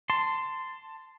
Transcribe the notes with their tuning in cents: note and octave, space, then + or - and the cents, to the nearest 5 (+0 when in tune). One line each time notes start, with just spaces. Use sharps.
A5 +15 C6 -10